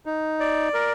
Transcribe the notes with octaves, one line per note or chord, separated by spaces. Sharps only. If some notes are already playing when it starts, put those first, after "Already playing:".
D#4
D5
A#4